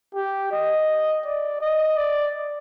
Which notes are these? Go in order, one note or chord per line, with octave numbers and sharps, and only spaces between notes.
G4
D#5
D5
D#5
D5